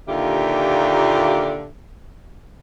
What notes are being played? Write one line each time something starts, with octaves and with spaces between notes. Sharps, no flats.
D#2 A#2 D3 F4 G4 E5